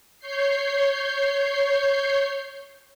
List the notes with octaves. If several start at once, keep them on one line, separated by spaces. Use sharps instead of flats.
C#5 G6 C7